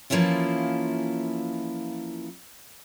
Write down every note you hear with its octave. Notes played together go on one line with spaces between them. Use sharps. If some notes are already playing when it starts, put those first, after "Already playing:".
E3 F3 A#3 C#4 E4 F4